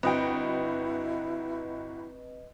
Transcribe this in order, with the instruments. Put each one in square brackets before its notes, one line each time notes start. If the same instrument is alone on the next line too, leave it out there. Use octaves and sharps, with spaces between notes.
[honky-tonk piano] G1 F#4 G5 [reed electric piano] C4 [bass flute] E4 [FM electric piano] B4 D#5